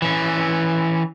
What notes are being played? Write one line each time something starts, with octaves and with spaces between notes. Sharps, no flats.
E3 C#4